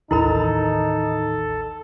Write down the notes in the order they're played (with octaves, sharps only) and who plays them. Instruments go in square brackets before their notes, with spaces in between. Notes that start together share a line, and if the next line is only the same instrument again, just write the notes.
[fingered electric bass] A1 D#2 [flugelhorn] D#4 [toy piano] E4 A#4 B5 [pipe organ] A4